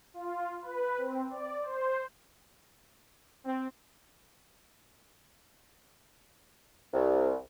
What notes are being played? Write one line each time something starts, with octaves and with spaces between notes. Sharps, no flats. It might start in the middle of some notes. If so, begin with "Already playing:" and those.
F4
B4
C4
D5
C5
C4
C2